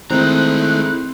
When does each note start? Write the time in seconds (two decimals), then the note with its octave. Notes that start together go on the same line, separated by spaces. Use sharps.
0.10 D#3 G#3 A3 C4 E4 A#5 F#6